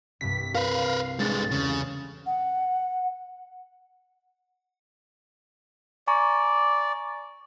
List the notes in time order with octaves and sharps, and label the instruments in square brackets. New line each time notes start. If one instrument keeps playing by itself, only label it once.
[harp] C2 G2 G3 [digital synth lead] B6
[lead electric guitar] A#4 B4 [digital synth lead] F5
[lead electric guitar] G2 G#3 [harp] G3 D4 A4 [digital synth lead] A6
[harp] E2 [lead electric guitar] C#3
[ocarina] F#5
[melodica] D5 [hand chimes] G#5 A#5 C#6